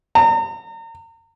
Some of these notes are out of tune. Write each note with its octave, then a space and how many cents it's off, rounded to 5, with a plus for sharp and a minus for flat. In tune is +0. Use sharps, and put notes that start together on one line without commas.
A#5 -35